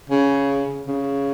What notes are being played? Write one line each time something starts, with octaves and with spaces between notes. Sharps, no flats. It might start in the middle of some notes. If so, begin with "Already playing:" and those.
C#3
C#3